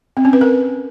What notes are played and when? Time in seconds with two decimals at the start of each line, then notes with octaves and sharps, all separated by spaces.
0.17 C4
0.25 C#4
0.33 B4
0.41 A#4